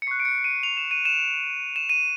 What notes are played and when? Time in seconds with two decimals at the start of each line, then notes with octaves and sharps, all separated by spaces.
0.02 C#7
0.07 C#6 F#6 C7
0.20 D7
0.25 C#7
0.44 D#7
0.63 F7
0.77 E7
0.91 D#7
1.05 E7
1.76 E7
1.89 D#7